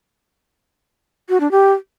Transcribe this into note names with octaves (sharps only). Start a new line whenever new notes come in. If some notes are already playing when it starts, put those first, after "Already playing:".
F#4
D4
G4